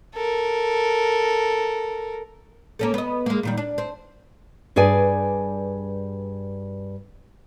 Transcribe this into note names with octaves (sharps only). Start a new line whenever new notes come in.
A4 A#4
A#3 C#4 A4
B3 D#5
G#3 A#3
A#2 D#3 G3
D4
C4
G2 G#4 B4 D5 G#5